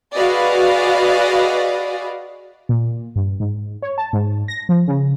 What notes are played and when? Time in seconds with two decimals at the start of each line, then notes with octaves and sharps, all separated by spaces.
0.16 F#4 G#4 B4 D5 D#5 F5
2.69 A#2
3.16 G2
3.40 G#2
3.82 C#5
3.98 A5
4.13 G#2
4.48 A#6
4.69 F3
4.88 C#3